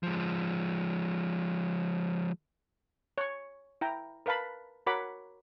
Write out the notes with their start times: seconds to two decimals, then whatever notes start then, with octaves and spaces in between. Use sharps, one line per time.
0.03 F3 G#3
3.18 C#5 C#6
3.81 E4 G5 A#5
4.26 A#4 B4 F5 A5 B5
4.86 F#4 A#4 C#5 F#5 B5 D6